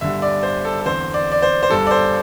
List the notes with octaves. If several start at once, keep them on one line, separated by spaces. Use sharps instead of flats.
G1 G2 D3 G3 E5
D5
C5
A4
A4
E2 D3 C4 C5
D5
D5
C5
C5
G1 G2 G3 A4
D5
C5